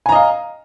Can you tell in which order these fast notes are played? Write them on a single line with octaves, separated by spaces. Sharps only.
G#5 A#5 D#5 F5